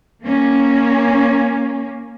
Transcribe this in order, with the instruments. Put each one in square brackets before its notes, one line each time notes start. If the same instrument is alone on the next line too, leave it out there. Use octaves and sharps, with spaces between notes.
[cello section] A#3 C#4